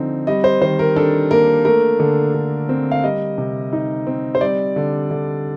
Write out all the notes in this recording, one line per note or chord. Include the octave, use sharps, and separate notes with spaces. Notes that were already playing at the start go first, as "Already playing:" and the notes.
Already playing: D3 F3 C4 D#4
G3 D#5
C5
D#3 C5
A#4
D4 A4
A#3 A#4
A3 A#4
D3
D3
C4
F5
G3 D#5
C3
D#4
C4
C5
G3 D5
D3
D3